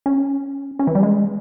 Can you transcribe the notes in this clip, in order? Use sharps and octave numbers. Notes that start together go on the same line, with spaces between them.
C#4
C#4
E3
G3
G#3